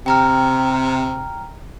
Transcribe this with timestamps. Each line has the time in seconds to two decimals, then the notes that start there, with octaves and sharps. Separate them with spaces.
0.06 C3 G5 A#5 F6